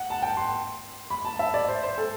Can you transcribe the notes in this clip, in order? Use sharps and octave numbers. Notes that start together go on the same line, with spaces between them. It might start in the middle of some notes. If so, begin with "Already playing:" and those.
Already playing: F#5
A5
G5
C6
B5
A5
E5
D5
C5
C5
A4